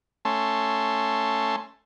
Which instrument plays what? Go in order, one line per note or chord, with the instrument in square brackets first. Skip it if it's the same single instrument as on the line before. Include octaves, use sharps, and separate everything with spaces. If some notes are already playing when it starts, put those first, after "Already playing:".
[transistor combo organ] A3 C#4 A5 C6